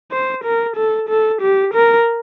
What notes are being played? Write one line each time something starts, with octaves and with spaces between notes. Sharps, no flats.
C5
A#4
A4
A4
G4
A#4